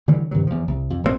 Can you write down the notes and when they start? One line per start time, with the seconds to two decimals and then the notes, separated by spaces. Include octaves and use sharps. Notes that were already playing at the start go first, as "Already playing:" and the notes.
0.08 D3 E3 F#3 G3
0.31 G2 C3 D#3 F#3
0.47 E2 F3
0.68 C2
0.90 F2
1.03 A#1 G#2 D3 C4